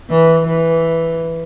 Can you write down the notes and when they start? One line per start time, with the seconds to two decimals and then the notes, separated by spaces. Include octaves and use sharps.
0.10 E3
0.47 E3